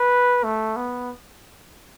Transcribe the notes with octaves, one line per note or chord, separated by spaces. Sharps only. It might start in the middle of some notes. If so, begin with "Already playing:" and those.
Already playing: B4
A3
B3